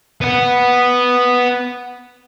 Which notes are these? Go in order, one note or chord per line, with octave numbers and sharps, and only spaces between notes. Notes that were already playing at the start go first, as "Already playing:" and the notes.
B3 F#5